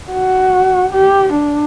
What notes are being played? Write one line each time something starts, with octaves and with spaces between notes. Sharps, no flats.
F#4
G4
D4